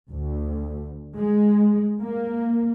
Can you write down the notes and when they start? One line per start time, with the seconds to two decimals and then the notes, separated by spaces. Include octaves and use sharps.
0.10 D2
1.16 G#3
2.02 A#3